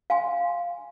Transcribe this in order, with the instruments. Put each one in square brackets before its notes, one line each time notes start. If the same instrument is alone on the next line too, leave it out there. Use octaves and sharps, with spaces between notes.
[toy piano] F5 G#5 C6